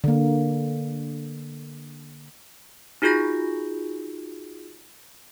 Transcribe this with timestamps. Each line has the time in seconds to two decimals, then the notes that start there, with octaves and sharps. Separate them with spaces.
0.04 D3 A#3
3.02 D#4 F4 F#4 G#4 G6 A#6